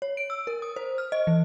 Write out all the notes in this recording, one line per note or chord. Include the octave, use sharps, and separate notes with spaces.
C#5
D7
E6
A#4
D#6
C5
F6
D#5
E3